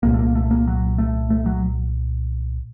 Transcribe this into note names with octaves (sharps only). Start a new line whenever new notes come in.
C2 A#2 A#3
A3
A#3
A3
A#3
F#3
A3
A3
F#3